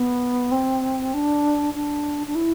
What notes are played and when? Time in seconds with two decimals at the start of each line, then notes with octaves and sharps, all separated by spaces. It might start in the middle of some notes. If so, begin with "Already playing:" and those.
Already playing: B3
0.52 C4
1.14 D4
1.74 D4
2.27 D4
2.35 E4